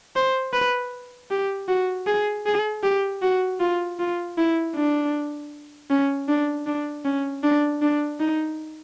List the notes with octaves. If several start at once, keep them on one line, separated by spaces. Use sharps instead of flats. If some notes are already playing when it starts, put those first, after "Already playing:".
C5
B4
G4
F#4
G#4
G#4
G4
F#4
F4
F4
E4
D4
C#4
D4
D4
C#4
D4
D4
D#4